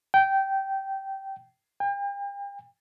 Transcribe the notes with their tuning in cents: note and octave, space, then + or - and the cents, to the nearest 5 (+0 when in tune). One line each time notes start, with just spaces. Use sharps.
G5 -15
G5 +40